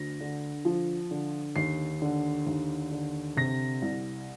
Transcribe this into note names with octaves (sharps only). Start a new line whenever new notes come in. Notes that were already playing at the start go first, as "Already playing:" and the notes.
Already playing: D2 A#6
D3
F3
D3
D#2 C7
D3
D#2
D3
C3 A#6
C2